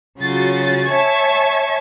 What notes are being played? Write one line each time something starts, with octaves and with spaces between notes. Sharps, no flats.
C#3 F#3 F4 F#4 G#4 A6
C#5 E5 G#5 A5 C#6 G#6